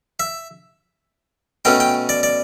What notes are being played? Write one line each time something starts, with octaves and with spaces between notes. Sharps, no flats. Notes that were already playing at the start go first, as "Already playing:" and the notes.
E5
B2 A3 C#4 G5
G5
D5
D5